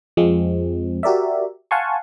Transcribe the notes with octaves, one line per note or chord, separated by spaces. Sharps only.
F2 F3 G#3 C4
F#4 G4 A#4 D5 E5
F5 F#5 G#5 A5 C6 C#6